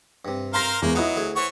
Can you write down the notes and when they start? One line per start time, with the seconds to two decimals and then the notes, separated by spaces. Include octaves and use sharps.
0.25 G2 C3
0.54 A#4 C5 F5 A#5 C6 A#6
0.82 E2 G#3 A#3 B3
0.95 F#3 B3 D#4 E4 D#5 F5
1.16 D2 G#4
1.36 E3 C5 C#5 F#5 C#6